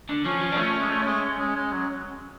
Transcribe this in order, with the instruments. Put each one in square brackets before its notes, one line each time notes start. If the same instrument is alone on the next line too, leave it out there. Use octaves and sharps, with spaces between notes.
[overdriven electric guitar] D3
[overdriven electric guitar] F3 [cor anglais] C#4
[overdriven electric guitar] F3
D4
[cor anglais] A3 [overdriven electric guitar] C#4
[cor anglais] G#3
A3
G#3
G#3
G#3
F#3